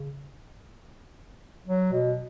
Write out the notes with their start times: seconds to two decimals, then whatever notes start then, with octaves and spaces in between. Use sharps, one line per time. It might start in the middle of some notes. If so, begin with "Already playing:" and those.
Already playing: C#3
1.68 F#3
1.92 B2